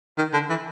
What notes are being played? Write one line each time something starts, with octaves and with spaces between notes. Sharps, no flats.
D#3
D3
E3